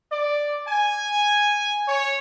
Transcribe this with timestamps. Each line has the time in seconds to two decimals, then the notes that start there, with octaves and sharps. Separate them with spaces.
0.11 D5
0.67 G#5
1.87 C#5